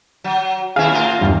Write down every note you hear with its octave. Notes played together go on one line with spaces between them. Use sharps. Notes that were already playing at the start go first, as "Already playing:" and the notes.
F#3
D#2 C#4 E4 G#4 F5
A2 F4 A#4
E2 G2